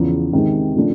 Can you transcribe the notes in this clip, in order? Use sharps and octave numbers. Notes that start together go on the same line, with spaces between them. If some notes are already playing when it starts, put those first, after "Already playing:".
Already playing: E2 C#3 F3
C3 D#3 G#3
C#3 F3 A3 D4